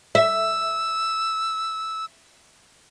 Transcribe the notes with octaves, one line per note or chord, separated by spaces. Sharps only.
E5 E6